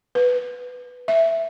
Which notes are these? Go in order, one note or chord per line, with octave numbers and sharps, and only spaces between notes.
B4
E5